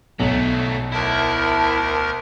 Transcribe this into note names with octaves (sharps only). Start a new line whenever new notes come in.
B1 F#3 A3
D2 E4 A#4 A5